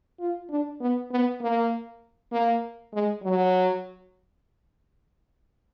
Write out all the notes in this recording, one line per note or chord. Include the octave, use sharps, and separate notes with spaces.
F4
D4
B3
B3
A#3
A#3
G#3
F#3